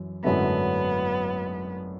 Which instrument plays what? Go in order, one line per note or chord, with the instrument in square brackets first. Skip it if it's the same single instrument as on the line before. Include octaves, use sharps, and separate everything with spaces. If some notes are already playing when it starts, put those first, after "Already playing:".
Already playing: [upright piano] F#2 E3
[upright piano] G#1 F#2 D3 A3 E4 [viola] B3